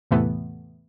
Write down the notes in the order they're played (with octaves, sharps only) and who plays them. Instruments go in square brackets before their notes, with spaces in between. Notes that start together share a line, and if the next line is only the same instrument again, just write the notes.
[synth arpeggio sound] E2 A2 C3 E3 A3 B3